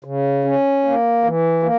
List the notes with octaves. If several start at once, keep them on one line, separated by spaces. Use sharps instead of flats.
C#3
C#4
A#3
E3
A#3